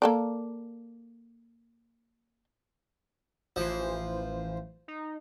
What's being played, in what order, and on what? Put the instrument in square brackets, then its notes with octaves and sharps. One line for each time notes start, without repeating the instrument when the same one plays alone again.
[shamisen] A#3 A4 D5
[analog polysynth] A1 E3 C5 [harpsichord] F3
[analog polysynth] D#4